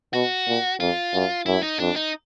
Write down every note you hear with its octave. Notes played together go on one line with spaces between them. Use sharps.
B2 F#4
A#2
F2 F4
F#2
F#2 E4
D#4
F2 D4
D#4